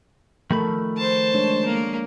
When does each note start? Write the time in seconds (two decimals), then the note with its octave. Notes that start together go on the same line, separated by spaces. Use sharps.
0.51 D#3 F3 A3 A4 A#4 B5
0.97 C5 A5
1.33 G#3 D4 C#5
1.66 A#3